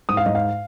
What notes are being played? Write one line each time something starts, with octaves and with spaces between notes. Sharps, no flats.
G#2 D#6
F5
G#2 D#5
F5